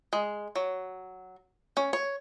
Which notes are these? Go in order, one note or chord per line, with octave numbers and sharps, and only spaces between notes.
G#3
F#3
C#4
C#5